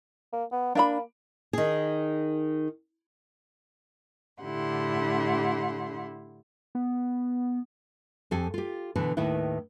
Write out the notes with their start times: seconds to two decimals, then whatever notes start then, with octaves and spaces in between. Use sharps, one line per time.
0.33 A#3
0.52 B3
0.75 A#3 D4 E5 B5
1.53 D#3 G#4
4.43 A2 D3 E4 G4 F#5 C6
6.75 B3
8.31 F2 C4 G4 A4 G#5
8.54 F4 G4
8.96 B2 D3 E3 B4
9.17 D#2 A2 D#3 E4 B4